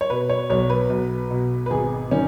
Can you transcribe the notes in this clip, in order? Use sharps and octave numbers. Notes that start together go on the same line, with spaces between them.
C#5
B2 B4
C#5
B1 C#5
B4
B1
B2
B4
G#1 G#4
D#3 C#4